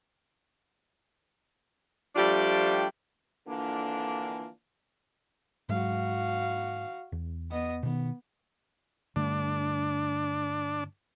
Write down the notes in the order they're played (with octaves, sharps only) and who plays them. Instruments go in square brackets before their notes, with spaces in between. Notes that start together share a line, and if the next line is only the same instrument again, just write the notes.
[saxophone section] F3 G3 A3 D4 F4 G4
[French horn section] F2 D3 E3 A#3 D4 F4
[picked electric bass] G#2 F#3 G#3 [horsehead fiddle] F#4 F5
[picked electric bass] E2
[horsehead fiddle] B3 D#5
[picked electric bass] B2 D#3 [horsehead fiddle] B3
[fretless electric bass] G2 D3 A3 [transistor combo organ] D4